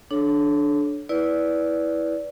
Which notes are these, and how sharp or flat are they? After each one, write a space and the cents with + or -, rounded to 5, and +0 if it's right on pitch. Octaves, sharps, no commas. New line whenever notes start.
D4 +0 A4 -30 C#5 +0
E4 -15 B4 +0 D5 -20